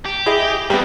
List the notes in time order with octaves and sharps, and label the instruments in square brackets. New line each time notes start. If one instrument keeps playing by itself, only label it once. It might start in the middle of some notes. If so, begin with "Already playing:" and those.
[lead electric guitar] G4
[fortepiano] E4 G#4 D#5
[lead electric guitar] G2 C4 [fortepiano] G3 B3